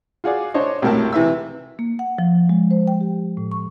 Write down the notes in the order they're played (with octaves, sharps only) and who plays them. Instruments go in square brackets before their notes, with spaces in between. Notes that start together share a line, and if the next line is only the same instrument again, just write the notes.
[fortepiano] F4 F#4 G#4 D5
D4 C5 C#5 D#5
C2 F#2 A2 A#4 G5 A5
C3 E3 E5 E6
[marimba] A#3
F#5
F3
G#3
C5
G5
G4
A2
C#6